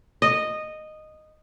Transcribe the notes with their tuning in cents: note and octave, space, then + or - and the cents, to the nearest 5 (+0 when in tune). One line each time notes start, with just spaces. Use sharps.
D#5 -10